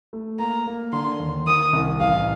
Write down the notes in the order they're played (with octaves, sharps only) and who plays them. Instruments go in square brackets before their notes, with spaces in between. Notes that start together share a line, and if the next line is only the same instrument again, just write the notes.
[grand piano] A3
[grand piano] A#3 [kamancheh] A#5
[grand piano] A#3
[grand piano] D3 [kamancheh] C6
[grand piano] D#2
[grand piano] D#3 [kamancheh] D#6
[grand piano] C2
[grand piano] A1 [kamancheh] F5